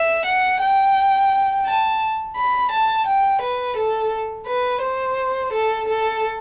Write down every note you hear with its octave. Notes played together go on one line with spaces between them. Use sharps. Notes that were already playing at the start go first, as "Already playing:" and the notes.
Already playing: E5
F#5
G5
A5
B5
A5
G5
B4
A4
B4
C5
A4
A4